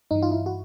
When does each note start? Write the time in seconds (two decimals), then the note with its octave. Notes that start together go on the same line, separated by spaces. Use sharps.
0.11 G2 E3 D#4
0.22 F4
0.31 E4
0.46 F#4